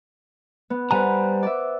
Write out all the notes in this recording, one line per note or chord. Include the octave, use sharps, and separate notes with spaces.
B3
G3 B4 C5 F#5 G#5 A#5
D5 E5